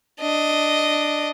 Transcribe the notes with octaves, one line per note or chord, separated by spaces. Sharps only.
D4 D#5